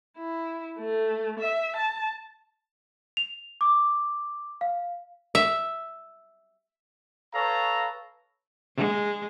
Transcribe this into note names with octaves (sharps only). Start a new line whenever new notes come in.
E4
A3
E5
A5
F7
D6
F5
E5
A4 B4 C#5 F5 A#5
G#3